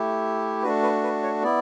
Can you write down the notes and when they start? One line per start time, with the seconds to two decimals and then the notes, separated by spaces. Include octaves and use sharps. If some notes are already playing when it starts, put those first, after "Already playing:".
Already playing: A3 E4 G4
0.63 A3 D4 F#4 B4
0.83 B4
1.03 B4
1.23 C#5
1.43 B3 E4 D5